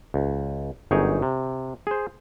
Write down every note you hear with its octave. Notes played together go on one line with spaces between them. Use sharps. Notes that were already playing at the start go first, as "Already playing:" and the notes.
C#2
G1 F#2 D#4 G#4 C#5 G5
C3
G#4 C5